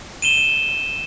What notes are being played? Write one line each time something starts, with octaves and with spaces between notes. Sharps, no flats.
D#7 E7 G7